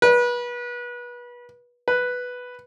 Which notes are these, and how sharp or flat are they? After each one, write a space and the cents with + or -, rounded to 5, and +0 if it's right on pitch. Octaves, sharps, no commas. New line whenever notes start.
B4 -30
B4 +0